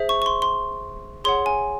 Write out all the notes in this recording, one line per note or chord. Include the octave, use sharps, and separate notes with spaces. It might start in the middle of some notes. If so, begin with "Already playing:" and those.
Already playing: G#4 C5 E5
C#6
C#6
C6
C6
G#4 C#5 F#5 C6
G#5